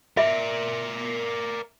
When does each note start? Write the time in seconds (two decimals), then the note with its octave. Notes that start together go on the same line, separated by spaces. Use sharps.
0.17 A#4 D5 E5